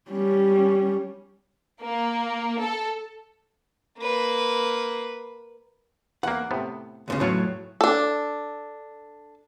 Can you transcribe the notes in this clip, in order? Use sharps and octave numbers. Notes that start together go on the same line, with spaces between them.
G3 C#4
A#3
A4
A#3 B4
E2 A#3 F#5
A2 C3 B3
D2 A#2 C#3
E2 A2 F#3 F4 C#5
D4 A4